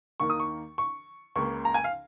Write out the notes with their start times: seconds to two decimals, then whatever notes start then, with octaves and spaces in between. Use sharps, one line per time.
0.20 D#2 D#3 A#3 C#6
0.30 D#6
0.40 C#6
0.78 C#6
1.36 C#2 C#3 A#3 C#6
1.65 A#5
1.74 G#5
1.84 F5